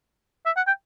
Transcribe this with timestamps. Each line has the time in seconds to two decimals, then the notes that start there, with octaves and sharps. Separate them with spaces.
0.46 E5
0.57 F#5
0.67 G5